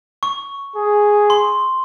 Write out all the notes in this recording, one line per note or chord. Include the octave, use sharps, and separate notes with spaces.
C#6
G#4
C6